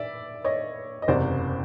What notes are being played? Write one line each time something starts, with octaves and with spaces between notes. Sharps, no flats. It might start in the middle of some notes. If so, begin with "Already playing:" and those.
Already playing: D5 E5
C#5 D#5
D#5
F#1 E2 C3 C5 D5